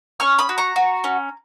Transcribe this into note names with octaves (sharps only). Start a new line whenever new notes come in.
C#4 C#6 F6
B5 D#6
F#4
A#5 C#6
F#4
C#4